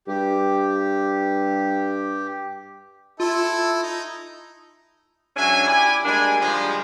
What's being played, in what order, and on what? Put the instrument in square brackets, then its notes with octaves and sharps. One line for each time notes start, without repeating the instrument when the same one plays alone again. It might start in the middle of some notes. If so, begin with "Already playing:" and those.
[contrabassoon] G2 [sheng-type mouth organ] G4
[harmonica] E4 A4 [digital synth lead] F4
[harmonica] D#4
[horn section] G#2 F#3 C#4 D4 E5 G#5
E4 G4 D5 G#5
G3 G#3 A#3 D4 G#5
D3 D#3 F3 G3 G#3